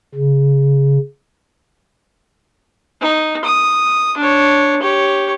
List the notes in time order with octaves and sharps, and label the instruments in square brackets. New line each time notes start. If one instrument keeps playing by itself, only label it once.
[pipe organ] C#3
[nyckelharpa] D#4
D#6
D4 C#5
G4 C#5